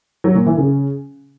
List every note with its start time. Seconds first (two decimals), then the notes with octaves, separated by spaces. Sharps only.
0.24 F#3
0.35 A#2
0.46 E3
0.58 C#3